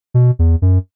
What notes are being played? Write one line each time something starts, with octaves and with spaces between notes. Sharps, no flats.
B2
E2
F#2